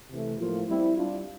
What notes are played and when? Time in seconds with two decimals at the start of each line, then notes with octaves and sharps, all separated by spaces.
0.11 C3 E3 A3
0.39 A2 F3 A#3 F4
0.68 G3 C4 E4
0.96 G3 D4 F4